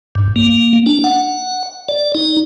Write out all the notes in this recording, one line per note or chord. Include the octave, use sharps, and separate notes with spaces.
G2
A#3
D4
F#5
D5
D#4